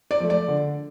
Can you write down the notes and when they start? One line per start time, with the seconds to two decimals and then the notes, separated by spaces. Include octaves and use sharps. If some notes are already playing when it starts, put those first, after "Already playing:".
0.11 D5
0.20 F3 A3
0.30 D5
0.48 D3